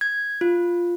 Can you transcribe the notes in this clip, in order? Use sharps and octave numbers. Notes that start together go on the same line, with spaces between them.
G#6
F4